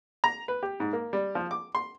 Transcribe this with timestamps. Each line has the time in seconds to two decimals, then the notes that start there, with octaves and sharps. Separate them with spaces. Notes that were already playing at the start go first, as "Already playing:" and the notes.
0.24 A#5
0.48 B4
0.63 G4
0.80 G#2
0.93 A#3
1.13 G3
1.35 F3
1.51 D6
1.75 C6